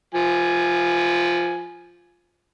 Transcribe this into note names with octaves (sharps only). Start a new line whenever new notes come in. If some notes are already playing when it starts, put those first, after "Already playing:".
F3 G#5